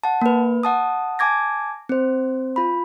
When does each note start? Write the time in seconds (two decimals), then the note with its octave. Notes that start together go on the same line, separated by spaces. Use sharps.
0.04 F#5 A5
0.22 A#3 B4
0.63 F#5 A5 D#6
1.19 G#5 A5 D6 G#6 A#6
1.89 C4 C5
2.56 F4 B5